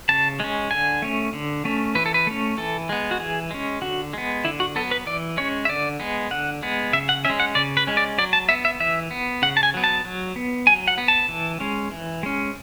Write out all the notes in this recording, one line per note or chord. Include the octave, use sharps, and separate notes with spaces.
C#3 A5
G#3 C#4
D3 G#5
A3 C#4
D3
A3 C#4
E3 B4
A4
B4
A3 C#4
E3 A4
G#3 B3
F#4
E3 G#4
G#3 C#4
D3 F#4
G#3 B3
D3 E4
F#4
F#3 B3 A4
B4
E3 D5
G#3 C#4 C#5
E5
D3 D5
G#3 B3
D3 F#5
G#3 B3
C#3 E5
F#5
G#3 C#4 E5
F#5
C#3 D5
B4
G#3 C#4
D5
F#3 D5
A5
B3 E5
E5
E3 E5
B3
C#3 F#5
A5
G#5
F#3 B3
A5
F#3
B3
F#3 G#5
F#5
B3
A5
E3
G#3 C#4
E3
G#3 C#4